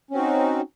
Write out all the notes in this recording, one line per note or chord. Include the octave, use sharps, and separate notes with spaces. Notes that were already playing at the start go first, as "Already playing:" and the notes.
C4 C#4 D#4 F#4